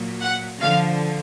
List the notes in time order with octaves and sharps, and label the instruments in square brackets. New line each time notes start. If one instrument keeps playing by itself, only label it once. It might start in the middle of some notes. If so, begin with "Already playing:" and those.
Already playing: [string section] A#2 F#3
F#5
D3 F3 F5